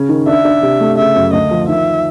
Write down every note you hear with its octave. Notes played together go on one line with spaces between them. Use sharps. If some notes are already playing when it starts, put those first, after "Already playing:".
Already playing: C#3 C#4
D#3
D4 E5
D4
C3
A3
C#3 E5
F#2
D2 D#5
F3
D#3 E5